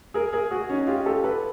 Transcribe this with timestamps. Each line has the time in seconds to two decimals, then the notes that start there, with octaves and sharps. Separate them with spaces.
0.14 G#4 A#4
0.33 G#4 A#4
0.51 F#4 G#4
0.70 C#4 D#4
0.87 F4 G4
1.06 G4 A4
1.24 A4 B4